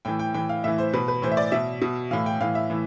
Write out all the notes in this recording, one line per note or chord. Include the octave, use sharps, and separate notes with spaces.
A2 E3 G5
G5
A2 E3 G5
F5
A2 E3 E5
C5
B2 B4
B4
A2 E3 C5
E5
D5
B2 E5
B2
A2 E3 F5
G5
A2 E3 F5
E5
A2 E3